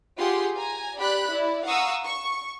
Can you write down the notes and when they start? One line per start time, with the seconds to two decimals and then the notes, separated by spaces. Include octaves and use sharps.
0.18 F4 G4 G#4 F#5 C6
0.55 G#5 A#5
0.96 G4 D5 B5 F#6
1.30 E4 D5
1.64 F5 F#5 A#5 C#6 D#6 E6
2.04 C#6